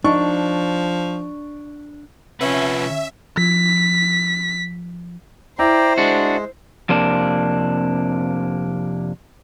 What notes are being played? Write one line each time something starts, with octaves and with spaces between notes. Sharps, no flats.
F3 D4 D#4 C#6
C3 F3 C#4 B4 E5 F#5
F3 B6
E4 C5 D5 G5 A#5
G#3 D4 F#4
F2 C3 A#3 D4